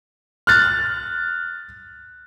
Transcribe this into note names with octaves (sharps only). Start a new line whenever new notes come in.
F6 F#6 A6